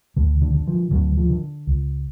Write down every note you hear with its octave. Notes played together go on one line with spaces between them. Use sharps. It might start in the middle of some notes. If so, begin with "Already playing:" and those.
D2 D3
D3
D3
F3
D2 D3 F#3
F3
D3
C#2